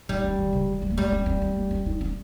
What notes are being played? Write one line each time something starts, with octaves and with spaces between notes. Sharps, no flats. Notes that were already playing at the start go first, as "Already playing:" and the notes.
G3 D#4
C#4
D#3
C#3
D#3
G3
A#3
G3 G#3
C#4
C4
C4
A#3
C#4
D#4
C#4